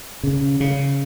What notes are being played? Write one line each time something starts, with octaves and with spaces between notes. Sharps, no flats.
C#3
C#3